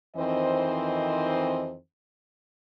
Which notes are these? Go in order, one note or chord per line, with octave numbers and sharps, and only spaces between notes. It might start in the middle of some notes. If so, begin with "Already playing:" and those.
F2 D#3 E3 C4 C5 D#5